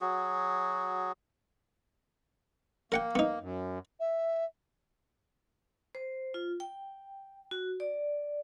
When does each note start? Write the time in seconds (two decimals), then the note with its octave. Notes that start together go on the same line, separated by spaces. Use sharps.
0.01 F#3 F#4 G#4
2.92 A#3 A#4 F#5 G5
3.15 B3 D#4
3.41 F#2
4.00 E5
5.95 C5
6.34 F4
6.60 G5
7.51 F#4
7.80 D5